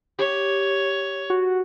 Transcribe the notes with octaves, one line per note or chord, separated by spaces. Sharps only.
G4 C#5
F#4